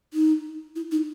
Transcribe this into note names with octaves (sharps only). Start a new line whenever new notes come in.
D#4
E4
D#4